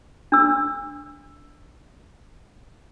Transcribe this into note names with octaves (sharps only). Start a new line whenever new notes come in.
D4 E6